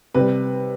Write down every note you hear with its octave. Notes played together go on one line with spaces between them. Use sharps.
C3 G3 B4